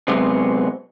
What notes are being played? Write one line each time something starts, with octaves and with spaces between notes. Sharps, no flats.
C3 F#3 G#3 B3 C4